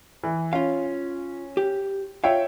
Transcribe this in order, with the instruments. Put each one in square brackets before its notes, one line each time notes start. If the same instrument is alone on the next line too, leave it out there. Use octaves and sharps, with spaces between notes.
[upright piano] E3
[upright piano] C#4 [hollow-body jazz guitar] F4 F5
[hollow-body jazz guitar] G4
[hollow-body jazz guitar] F4 F5 [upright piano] C#5 E5 G5